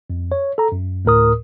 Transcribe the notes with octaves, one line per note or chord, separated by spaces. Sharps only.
F2
C#5
A4 A#5
F#2
D2 A2 A#4 D#6